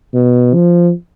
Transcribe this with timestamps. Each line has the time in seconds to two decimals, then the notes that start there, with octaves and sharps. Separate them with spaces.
0.14 B2
0.54 F3